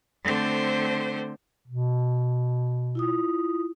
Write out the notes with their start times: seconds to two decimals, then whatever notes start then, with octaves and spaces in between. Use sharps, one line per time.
0.24 D3 A3 C4 C5
1.68 B2
2.95 E4 F4 D#6